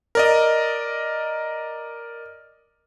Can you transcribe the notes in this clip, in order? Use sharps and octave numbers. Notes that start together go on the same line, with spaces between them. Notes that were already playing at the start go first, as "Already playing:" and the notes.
A#4 D5 D#5